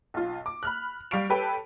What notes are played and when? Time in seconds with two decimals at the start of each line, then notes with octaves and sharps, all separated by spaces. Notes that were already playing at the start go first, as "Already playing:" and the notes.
0.14 B1 F4
0.46 D6
0.63 B5 F6 F#6
1.11 G3 F5 C#6 D7 F7
1.30 G4 A4 B4 C#5 G5 B5